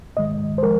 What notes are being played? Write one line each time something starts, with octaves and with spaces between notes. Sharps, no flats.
G#2 D#3 G#3 D#5
C5
F3 G#3 A#4